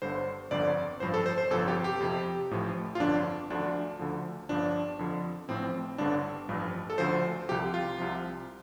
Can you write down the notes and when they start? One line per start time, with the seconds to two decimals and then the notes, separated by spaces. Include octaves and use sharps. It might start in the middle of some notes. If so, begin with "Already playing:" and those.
0.02 G1 G2 D3 C5
0.51 G1 F2 D3 D5
1.00 A1 G2 F3 C5
1.14 A4
1.26 C5
1.38 C5
1.50 G1 F2 C3 F3 A4
1.68 G4
1.84 G4
2.00 F2 C3 F3
2.51 A1 A2 F3
2.95 F4
3.00 G1 F2 D3 F3 D4
3.50 D2 D3 F3 D4
3.99 D2 D3 F3
4.49 G1 G2 F3 D4
4.99 F2 D3 F3
5.49 A1 A2 F3 C4
5.98 G1 G2 D3 D4
6.49 A1 G2 F3
6.90 A4
6.98 D2 D3 F3 C5
7.49 C2 C3 F3 G4
7.74 F4
7.98 C2 C3 F3